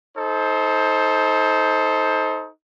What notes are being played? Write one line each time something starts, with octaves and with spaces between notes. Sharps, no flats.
D#4 A4 C5